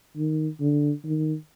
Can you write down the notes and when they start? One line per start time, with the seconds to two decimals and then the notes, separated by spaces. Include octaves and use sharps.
0.17 D#3
0.61 D3
1.04 D#3